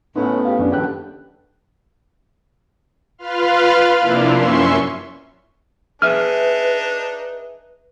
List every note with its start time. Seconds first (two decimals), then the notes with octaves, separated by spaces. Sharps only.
0.16 A2 B3 C#4 D#4
0.45 G4 F5
0.59 F#2 C#4 D4
0.72 D#2 D3 E3 G4 A4 G5 F#6
3.18 F4 B4 F5 C6 F6
3.98 C3 F3 A#3 D4 E4
4.33 F#2 C#4 E5 C6 C#6
6.02 D4 D#4 G#4 B4 E5 F6